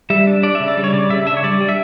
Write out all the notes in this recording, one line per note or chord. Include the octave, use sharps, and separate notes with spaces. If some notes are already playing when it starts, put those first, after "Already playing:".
G3 E5
D4
D4 D5
E5
C#3
D5
G3
C#5
C#3 D5
C#3 E5
D4 E5
C#5
G3 D5
G3
E5